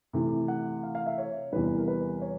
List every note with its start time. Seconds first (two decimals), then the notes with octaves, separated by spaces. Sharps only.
0.13 C3 E3 A3
0.48 F#5
0.83 F5
0.95 F5
1.06 E5
1.18 C#5
1.52 E2 C3 E3 G3 B4
1.77 A#4
1.88 B4
2.22 C#5